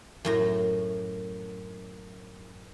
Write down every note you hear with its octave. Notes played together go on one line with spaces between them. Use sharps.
F#2 A2 A#5